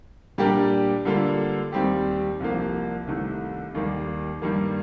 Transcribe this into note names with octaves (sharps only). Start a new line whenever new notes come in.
A#2 G3 D4 G4 A#4
D3 G3 A#3 F4 A4
D#2 D#3 G3 C4 G4
C2 C3 F3 A#3
C2 C3 D#3 A3
D#2 D#3 G3 A#3
G2 D#3 G3 A#3